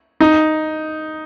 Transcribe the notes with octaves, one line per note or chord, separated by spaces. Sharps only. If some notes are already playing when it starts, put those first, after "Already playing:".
D#4